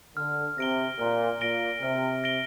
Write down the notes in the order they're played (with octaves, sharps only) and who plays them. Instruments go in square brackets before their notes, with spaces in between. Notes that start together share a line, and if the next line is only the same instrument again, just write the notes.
[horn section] D3 [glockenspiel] F6
[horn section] C3 [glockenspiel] A#6 D7 G7
[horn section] A#2 [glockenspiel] F6
[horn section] A#2 [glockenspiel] A#6 D7 G7
[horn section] C3 [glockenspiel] F6
[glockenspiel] A#6 D7 G7